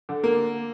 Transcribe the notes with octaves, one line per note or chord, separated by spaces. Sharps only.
D3
A#3